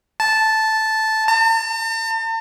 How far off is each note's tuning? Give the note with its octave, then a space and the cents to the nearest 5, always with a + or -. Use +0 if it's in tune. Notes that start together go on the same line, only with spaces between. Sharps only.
A5 -5
A5 +45